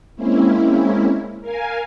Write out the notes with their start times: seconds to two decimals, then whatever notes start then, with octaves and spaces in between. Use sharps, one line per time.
0.16 G#3 A#3 C4 C#4 E4
1.41 A#4 F5 G#5